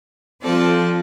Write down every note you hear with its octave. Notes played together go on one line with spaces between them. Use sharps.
F3 C4 F4 A4 D5